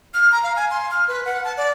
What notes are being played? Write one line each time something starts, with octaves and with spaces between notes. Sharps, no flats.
F6
A#5
F5
G#5
C6
F6
B4
F#5
A5
D5